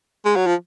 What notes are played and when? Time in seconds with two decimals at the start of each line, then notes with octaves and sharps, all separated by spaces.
0.25 G#3
0.36 F#3
0.47 F3